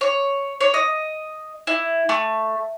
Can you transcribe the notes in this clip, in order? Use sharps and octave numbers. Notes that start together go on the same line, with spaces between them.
C#5
C#5
D#5
E4
A3